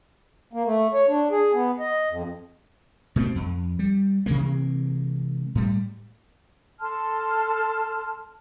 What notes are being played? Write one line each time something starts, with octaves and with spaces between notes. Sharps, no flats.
A#3
A3
C#5
D4
G#4
B3
D#5
F2
B2 A3 B3 C4
F2
G3
C3 E3 G#3 A#3
A2 G3
A4 A5 C6 F6